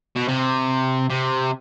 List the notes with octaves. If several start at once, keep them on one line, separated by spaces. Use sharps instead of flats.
B2
C3
C3